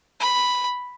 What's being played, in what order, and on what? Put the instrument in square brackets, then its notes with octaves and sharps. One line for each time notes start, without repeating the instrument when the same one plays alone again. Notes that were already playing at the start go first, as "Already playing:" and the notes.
[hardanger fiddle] B5